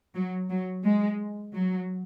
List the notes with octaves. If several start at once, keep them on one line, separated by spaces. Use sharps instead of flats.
F#3
F#3
G#3
F#3